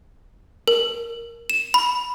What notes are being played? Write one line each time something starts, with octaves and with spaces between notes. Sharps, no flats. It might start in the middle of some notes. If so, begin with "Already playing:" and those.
A#4
E7
B5